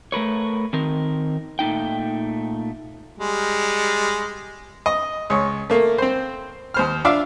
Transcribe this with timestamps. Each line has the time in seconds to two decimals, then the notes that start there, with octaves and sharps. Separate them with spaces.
0.12 A3 A#4 B4 C#5
0.73 D#3 C4 A#4
1.59 A#2 A3 D#4 G5
3.19 G3 G#3
4.86 D#5
5.30 C#2 C#5
5.70 A3 A#3
5.98 C4 C5
6.74 D#2 C5 F6
7.05 D4 F4 D5 E5 F5